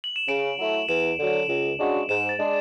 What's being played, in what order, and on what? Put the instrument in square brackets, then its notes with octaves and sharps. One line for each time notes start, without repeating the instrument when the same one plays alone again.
[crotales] F#7
E7
[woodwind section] C#3 [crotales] D7
[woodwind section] F#3 A3 E4
[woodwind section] E2 [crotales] E7
[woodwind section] D3 F#3
C#2
C#3 G#3 D4 F#4
[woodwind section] G#2 [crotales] E7
[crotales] A6
[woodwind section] G#3 D4